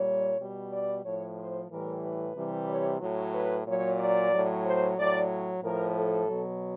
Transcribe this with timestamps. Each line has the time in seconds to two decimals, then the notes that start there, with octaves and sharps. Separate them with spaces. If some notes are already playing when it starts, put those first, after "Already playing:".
Already playing: A#2 G3 C#5
0.39 B2 G3
0.72 D5
1.04 A2 F3 C#5
1.38 C5
1.70 A2 E3 G3 A#4
2.03 B4
2.36 C3 E3 G3
2.69 C#5
3.01 A2 F#3
3.34 B4
3.67 A#2 F#3 C#5
3.99 D5
4.32 A2 F#3
4.65 C5
4.98 A2 F#3 D5
5.63 A2 F3 A#4
5.96 A4
6.29 B2 F#3